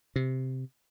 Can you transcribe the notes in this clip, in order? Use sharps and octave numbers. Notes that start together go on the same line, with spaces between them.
C3